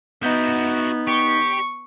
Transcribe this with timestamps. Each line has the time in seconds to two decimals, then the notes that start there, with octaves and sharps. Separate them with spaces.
0.23 B3 D#4 F#4 E5 G6
1.08 G4 C#6